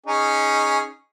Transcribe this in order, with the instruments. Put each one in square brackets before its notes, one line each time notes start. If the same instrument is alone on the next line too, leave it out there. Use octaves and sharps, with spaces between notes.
[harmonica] C#4 D#4 G#4